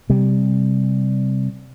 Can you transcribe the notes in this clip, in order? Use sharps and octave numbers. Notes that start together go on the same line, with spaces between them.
C3 G3